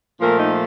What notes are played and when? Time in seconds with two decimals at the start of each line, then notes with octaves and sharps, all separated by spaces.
0.20 A#2 F3 A3 A#4
0.39 D#4